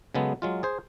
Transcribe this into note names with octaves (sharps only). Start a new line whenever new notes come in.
C#3 F#3 G#3 B3 A4
F#3 G#3 F4
G#4 C5